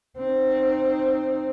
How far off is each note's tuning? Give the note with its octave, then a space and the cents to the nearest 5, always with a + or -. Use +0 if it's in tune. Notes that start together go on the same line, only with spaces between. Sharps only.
C4 +0 D#4 -20